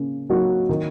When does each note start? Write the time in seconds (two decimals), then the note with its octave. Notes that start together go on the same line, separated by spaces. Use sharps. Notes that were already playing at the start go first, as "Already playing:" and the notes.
Already playing: C#3 A#3
0.30 F#3 A#3 D#4 F#4
0.69 D#3